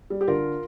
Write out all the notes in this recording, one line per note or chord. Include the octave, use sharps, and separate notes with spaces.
G3
G4
D3 F4 A#4